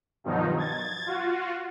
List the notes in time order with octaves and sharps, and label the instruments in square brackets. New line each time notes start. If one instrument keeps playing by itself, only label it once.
[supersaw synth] G2 B2 D#3 F3 F#3 D#4
G#6 A6
F4 F#4